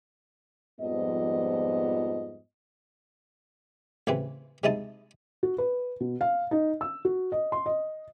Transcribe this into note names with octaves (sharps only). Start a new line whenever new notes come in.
F2 G#2 F3 G3 B3 D#5
A1 C#3 E3 C4 B4
C3 G#3 D#4 E4 A5 D#6
F#4
B4
B2
F5
D#4
E6
F#4
D#5
C6
D#5